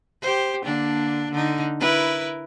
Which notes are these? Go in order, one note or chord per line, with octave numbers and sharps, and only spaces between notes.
G4 C5
D3 A#3 D4
D3 D#4
E4 A#4 B4